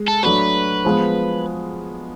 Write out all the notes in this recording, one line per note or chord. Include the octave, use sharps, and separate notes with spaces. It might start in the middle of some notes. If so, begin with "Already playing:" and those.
Already playing: G#3
A4
F#3 A3 D4 F#4 B4
F3 G#3 B3